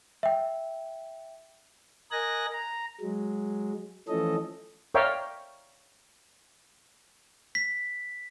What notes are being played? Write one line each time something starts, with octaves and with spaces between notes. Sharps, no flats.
E5 G5
A#4 D#5 G#5 F#6 A#6
A#5
F#3 G#3
E3 F3 A3 C#4 A4 D#5
A#4 C#5 D5 E5 F5 G5
B6